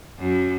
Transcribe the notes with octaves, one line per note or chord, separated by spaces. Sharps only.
F#2